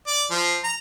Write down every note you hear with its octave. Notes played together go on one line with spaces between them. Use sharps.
D5
F3
A#5